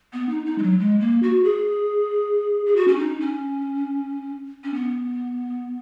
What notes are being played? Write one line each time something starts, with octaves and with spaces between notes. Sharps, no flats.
B3
D#4
D#4
G#3
F#3
G#3
A#3
F#4
G#4
G#4
F#4
C#4
D#4
C#4
C#4
B3